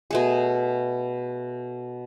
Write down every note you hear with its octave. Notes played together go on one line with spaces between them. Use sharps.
B2 A3 G#4